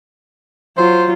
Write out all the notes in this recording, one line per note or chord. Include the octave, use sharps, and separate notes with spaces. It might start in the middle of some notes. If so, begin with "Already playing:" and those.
F#3 F4 C5